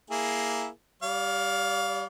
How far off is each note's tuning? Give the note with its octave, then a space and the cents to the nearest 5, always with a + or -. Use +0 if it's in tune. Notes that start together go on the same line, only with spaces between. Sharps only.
A#3 +0 E4 -10 G#4 +0
G3 +0 D5 -45 F5 +15